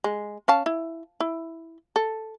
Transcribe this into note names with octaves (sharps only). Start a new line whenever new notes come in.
G#3
C#4 F5 A5
E4
E4
A4